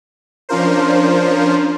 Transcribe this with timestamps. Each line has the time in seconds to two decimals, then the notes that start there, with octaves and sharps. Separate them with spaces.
0.49 F3 C#4 D4 F4 A#4 C5